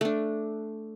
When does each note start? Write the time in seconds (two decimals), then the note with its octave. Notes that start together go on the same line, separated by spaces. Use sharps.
0.01 A3 D4